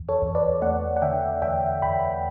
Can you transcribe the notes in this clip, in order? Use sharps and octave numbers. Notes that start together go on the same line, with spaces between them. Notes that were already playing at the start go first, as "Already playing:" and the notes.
Already playing: E2
A4 C#5
E2
B4 D5
A3 D5 F#5
F#5
D3 E5 G5
E2 E5 G5
E2 G5 B5